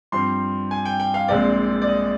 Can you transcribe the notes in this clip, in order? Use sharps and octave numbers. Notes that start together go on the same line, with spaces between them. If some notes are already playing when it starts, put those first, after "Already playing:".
G2 F3 C4 C6
G#5
G5
G5
F5
A#1 A#2 G#3 C4 D5
D5
D#5